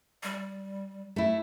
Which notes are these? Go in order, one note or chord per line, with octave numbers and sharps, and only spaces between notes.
G3
A3 E4